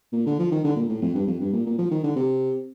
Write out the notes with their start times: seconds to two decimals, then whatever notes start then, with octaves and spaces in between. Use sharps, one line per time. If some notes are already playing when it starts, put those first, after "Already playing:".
0.13 A#2
0.26 D3
0.39 F3
0.52 D#3
0.64 D3
0.76 A#2
0.89 A2
1.02 F2
1.15 G2
1.27 F2
1.40 G2
1.53 A#2
1.66 A#2
1.78 F3
1.91 D#3
2.04 D3
2.16 C3